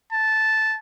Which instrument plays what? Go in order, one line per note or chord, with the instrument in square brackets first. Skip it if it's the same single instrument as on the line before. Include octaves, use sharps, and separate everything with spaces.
[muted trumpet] A5